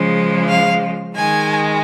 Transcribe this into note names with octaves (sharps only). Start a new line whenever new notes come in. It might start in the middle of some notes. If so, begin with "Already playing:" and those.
Already playing: C#3 F3 G#3
F5
D#3 G#3 G#5